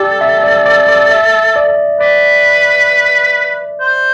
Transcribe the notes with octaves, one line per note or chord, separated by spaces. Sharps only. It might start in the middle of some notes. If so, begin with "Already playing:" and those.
Already playing: G4 A4 D5
E5
D5
D5
D5
E5
D5
B4 D5
C5